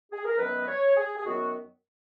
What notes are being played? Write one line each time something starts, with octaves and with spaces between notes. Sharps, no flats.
G#4
A#4
F#2 D#3 F#3 B3 B4
D#5
C#5
G#4
G#4
F#2 D#3 F#3 B3 F#4